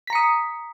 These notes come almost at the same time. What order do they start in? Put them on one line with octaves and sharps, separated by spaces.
B6 A#5 C#7 D#6